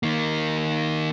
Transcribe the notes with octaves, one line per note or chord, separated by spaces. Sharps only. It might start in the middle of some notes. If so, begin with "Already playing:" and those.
D#3 A#3